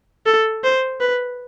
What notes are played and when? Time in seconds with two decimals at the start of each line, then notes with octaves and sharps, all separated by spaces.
0.26 A4
0.64 C5
1.00 B4